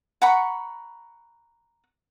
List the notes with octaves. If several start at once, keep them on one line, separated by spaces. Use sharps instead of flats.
F#5 A#5 B5 C#6